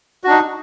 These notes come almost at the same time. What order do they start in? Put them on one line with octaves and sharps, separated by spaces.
F#4 D4 D#4